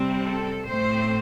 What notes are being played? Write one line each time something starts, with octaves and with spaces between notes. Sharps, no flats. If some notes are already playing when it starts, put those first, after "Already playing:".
Already playing: C3 G3 C4
A4
A2 A3 C4 C5